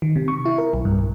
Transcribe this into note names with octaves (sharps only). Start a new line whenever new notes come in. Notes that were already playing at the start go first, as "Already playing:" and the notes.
D#3
C3
C#6
E4
A#4
B1
G2
B1